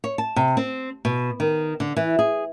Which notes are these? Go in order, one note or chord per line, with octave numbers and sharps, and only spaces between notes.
C#5
A5
C3
C4
B2
D#3
D3
E3
G#4